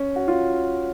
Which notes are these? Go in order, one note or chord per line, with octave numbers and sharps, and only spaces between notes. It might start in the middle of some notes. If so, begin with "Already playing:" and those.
Already playing: C#4
F#4
F4